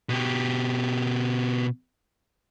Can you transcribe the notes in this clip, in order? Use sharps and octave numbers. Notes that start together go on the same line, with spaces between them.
B2 G4